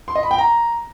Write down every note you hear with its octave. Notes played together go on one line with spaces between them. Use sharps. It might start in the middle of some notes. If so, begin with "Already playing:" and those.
C6
D#5
B5
G5
A#5